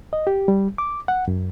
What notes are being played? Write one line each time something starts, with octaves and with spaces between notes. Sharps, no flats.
D#5
G4
G3
D6
F#5
F#2